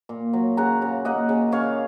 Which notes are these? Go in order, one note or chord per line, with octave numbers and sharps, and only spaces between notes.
A#2
F#3
C#3 F#5 A#5
C#3
A#3 D#5 F#5
C#3
C#3 C#5 F5